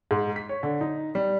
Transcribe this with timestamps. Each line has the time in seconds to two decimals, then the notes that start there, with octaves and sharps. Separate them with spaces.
0.11 G#2
0.36 B6
0.49 C#5
0.63 D3
0.81 D#4
1.15 G3